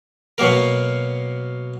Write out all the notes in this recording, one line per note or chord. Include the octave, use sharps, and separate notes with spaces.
B2 F#3 A#3 A#4